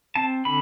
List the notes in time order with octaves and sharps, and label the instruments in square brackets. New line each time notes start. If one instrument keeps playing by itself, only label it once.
[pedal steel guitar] C4 A5
D3 B5